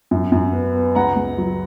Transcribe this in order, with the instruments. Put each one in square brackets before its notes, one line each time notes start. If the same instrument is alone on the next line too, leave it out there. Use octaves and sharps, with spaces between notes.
[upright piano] F#2
F#2
B3
B3
C#2 F#5 A#5
C#2
F#3